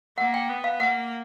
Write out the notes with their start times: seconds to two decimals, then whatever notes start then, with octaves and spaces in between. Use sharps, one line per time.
0.18 A#3 F#5
0.34 G5
0.49 B3
0.64 F5
0.80 A#3 F#5